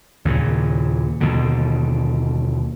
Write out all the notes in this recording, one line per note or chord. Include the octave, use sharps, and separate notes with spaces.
D#2 A#2 C#3
D#2 B2 D3